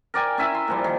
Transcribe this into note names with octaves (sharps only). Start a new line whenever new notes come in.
A#4 D5 G5 G#5
C#4 E4 E5 G#5
C6
A#2 F3 G3
D#3